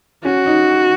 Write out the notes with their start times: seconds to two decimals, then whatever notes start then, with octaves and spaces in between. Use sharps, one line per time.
0.25 C#4 F#4
0.46 D#4